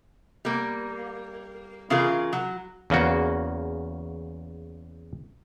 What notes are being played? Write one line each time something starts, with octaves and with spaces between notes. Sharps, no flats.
G3 A#3
C#3 E3 F4 G#4 A#4
F#3
E2 C#3 A#3 F#4